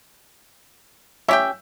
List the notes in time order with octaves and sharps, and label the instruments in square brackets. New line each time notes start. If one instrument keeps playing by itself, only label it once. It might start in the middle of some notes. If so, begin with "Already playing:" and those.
[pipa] C#4 G4 G5 [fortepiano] E5